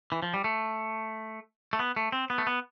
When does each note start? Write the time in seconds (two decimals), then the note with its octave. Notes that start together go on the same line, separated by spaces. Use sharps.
0.12 E3
0.23 F3
0.34 G3
0.44 A3
1.73 A3
1.79 B3
1.96 A3
2.12 C4
2.30 B3
2.38 A3
2.47 B3